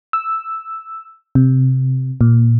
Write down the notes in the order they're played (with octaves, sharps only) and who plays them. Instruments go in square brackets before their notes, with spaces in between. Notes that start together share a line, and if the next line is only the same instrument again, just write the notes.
[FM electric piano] E6
C3
A#2